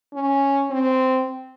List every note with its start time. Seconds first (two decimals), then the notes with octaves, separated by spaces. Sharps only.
0.14 C#4
0.70 C4